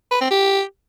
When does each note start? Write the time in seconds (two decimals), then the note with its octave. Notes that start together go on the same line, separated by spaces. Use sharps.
0.11 B4
0.21 C4
0.31 G4